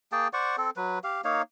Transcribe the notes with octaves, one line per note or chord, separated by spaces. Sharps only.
A#3 G#4 G5 A5
C5 D5 F#5 C#6
C4 A4
F#3 B4
G4 F5
A#3 D#4 C#5 F5